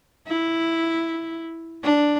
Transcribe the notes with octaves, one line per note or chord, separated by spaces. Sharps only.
E4
D4